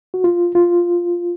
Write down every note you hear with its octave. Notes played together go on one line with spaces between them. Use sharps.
F#4
F4
F4